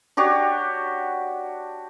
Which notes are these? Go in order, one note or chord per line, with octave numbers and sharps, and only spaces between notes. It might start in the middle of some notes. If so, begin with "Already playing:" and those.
D4 F#4 G4 C#5